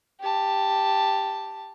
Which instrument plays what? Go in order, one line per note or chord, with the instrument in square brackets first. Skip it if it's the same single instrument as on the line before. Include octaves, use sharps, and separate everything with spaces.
[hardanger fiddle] G4 A5